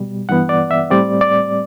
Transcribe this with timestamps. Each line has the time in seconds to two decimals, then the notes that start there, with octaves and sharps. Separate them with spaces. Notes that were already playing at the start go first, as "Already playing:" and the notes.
Already playing: B2 G3
0.29 G2 E3 B3 F#5
0.49 D5
0.71 E5
0.90 A2 G3 C4 D5
1.21 D5